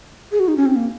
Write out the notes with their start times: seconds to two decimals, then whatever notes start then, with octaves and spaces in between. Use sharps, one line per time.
0.32 G#4
0.40 F#4
0.48 D#4
0.57 C#4
0.66 C4
0.76 A#3